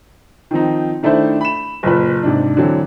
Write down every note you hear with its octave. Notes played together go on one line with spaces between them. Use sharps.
D#3 F3 C4 D#4
D#3 A3 D4 E4 C5
B5 E7
F#1 A#2 B4
G#2 C3 D4
D3 E3 F#3 C4 D4